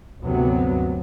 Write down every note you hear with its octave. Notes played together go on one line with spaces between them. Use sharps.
D2 G2 C3 F#3 B3